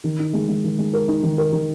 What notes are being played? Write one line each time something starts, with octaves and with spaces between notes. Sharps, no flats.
D#3
D#4
G#3
G#3
D#3
G#3
A#4
D#4
D#3
A#4
D#3